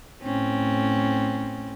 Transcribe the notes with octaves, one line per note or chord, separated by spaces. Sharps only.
A2 C4 C#4